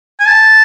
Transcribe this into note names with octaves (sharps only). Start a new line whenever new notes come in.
G#5
A5